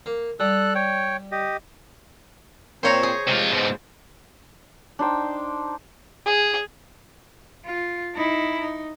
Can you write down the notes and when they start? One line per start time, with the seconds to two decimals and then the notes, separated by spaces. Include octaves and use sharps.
0.06 A#3
0.40 G3 A4 F#6
0.75 C#5 G5
1.32 G4 D#5
2.83 A#2 C4 C5 C#5 A#5
3.03 G#4
3.28 C3 G#3 F4 C5
3.52 G#2 B2
4.99 D4 D#4 C5 G5
6.26 G#4
7.64 F4
8.14 D#4 E4
8.60 D#4